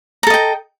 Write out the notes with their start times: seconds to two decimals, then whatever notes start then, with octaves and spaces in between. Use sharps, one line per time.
0.23 A#5
0.27 A4
0.30 D#5
0.34 G5